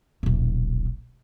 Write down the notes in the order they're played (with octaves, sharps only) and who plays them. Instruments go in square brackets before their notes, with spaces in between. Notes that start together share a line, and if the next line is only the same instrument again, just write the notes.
[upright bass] D#1 B1